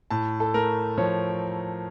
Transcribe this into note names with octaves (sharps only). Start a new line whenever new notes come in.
A2 A5
A4
A3 A#4
F3 C#5